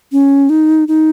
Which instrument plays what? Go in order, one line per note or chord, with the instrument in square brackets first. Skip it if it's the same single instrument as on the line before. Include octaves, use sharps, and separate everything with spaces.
[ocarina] C#4
D#4
D#4